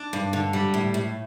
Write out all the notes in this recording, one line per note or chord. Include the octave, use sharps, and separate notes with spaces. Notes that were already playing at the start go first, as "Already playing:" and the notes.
Already playing: D4
G2
D3
G3
A2
A2